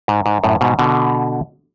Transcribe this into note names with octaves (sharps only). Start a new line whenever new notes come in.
G#2
G#2
F#2 A2
G#2 B2
B2 D3